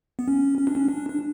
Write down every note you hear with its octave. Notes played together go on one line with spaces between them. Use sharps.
B3
C#4
C#4
D4
C#4
D4
D4